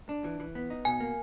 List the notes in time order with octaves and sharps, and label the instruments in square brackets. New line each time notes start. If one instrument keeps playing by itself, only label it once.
[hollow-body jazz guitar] D4
E3
E3
B3
D#4
[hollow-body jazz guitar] B2 [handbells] G#5
[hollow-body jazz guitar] A#3